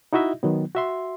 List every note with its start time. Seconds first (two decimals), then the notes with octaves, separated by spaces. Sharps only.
0.13 D#4 E4 F#4 D#5 E5
0.43 D#3 F#3 B3
0.75 F#4 E5 C6